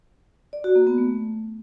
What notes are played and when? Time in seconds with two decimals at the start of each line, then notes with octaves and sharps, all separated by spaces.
0.53 D5
0.64 F#4
0.75 A#3
0.87 B3
0.98 A3